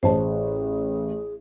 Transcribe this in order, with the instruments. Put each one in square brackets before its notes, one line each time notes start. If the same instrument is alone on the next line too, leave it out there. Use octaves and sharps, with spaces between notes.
[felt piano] A1 [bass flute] G#4 [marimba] C5 A5